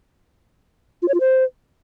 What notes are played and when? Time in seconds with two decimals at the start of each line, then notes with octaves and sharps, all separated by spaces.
1.02 F4
1.08 C#5
1.14 F4
1.20 C5